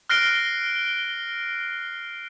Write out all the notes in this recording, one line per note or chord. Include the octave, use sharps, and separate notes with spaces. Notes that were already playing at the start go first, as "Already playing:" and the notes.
F6 F#6 A#6 C7 D7 G7